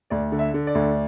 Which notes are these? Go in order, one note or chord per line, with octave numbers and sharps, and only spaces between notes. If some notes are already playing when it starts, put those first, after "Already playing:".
D2 D5
D3
E5
D3
D5
D2